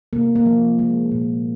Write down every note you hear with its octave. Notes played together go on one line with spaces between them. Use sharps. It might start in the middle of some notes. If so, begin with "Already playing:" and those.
C3 A#3
A#3
F3
G#3
A#2